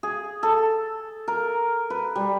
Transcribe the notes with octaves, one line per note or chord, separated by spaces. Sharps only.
G#4
A4
A#4
B4
G3